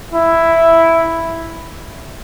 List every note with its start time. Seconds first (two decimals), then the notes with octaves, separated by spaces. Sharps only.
0.14 E4